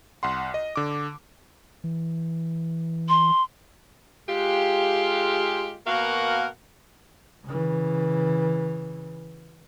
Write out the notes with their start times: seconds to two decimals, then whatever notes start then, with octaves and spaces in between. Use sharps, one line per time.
0.23 C2 F#5 C6
0.54 D#5
0.76 D3 D6
1.84 E3
3.09 C6
4.28 G#3 F4 G4
5.86 B2 A#3 F#4 A#4 F5 F#5
7.44 C#3 E3